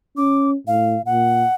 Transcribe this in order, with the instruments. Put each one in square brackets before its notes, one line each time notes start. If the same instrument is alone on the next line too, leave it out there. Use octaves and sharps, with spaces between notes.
[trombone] C#4 [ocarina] D6
[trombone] A2 [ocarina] F5
[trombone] A#2 [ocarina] F#5